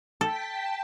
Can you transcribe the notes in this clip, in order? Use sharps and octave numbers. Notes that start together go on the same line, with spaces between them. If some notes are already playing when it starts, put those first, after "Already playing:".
A4 G5 A5 B6